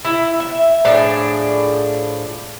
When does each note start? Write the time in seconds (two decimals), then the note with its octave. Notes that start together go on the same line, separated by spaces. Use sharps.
0.05 E4
0.40 E5
0.85 A2 F3 D4 G#4